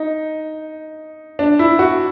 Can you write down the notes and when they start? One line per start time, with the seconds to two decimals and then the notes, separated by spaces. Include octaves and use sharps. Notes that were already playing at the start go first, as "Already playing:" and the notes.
Already playing: D#4
1.39 D4
1.59 E4
1.79 F#4